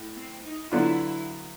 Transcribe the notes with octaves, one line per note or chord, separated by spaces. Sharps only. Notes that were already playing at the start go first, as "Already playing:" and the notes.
Already playing: A2
C4
D#4
D3 F#3 B3 D4 E4 F4